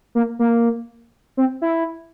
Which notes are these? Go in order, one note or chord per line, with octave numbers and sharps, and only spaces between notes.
A#3
A#3
C4
E4